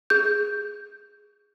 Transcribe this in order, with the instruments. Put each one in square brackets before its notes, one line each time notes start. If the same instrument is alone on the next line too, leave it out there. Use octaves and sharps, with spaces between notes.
[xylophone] G#4 G6